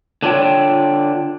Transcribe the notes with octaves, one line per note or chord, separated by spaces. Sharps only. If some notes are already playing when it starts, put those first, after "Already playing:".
D3 D4 F4 C#5 G5